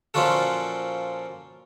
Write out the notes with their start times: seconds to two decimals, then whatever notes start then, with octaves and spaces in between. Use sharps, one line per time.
0.14 A#2 F3 C#4 F4 F#4 A4